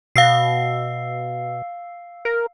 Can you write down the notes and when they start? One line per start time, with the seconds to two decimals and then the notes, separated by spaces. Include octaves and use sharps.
0.16 B2 F5 E6 C7
2.25 A#4